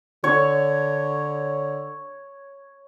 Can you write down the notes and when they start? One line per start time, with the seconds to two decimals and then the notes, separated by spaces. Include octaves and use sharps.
0.24 D3 C#5